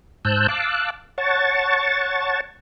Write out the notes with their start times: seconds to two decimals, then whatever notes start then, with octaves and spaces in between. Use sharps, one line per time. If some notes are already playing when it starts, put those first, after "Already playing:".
0.25 G#2 C5 A5 E6 F#6 G6
0.48 F5 A5 D6 E6 F#6
1.18 C#5 F#5 A5 C#6 A6